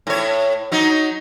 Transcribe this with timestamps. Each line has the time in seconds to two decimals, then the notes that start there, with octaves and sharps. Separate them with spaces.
0.07 A2 C#5
0.72 F#3 D#4